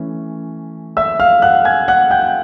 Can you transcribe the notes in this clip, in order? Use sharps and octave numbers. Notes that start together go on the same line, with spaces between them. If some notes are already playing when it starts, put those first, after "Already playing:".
Already playing: E3 A3 C#4
E5 E6
F5 F6
F#5 F#6
G#5 G#6
F#5 F#6
G5 G6